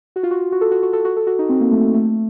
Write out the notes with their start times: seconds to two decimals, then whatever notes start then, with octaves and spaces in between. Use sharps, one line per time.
0.16 F#4
0.23 F4
0.31 F#4
0.52 F#4
0.61 A4
0.71 F#4
0.83 F#4
0.93 A4
1.05 F#4
1.17 A4
1.27 F#4
1.39 D#4
1.49 C4
1.61 A#3
1.71 A3
1.82 A3
1.94 A3